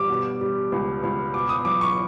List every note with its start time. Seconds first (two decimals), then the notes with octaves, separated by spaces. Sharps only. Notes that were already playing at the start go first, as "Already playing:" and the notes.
Already playing: G1 G3 D6
0.10 B2
0.41 G3
0.72 C#2
1.03 C#2
1.34 B2 D6
1.49 D#6
1.65 F#3 D6
1.81 C#6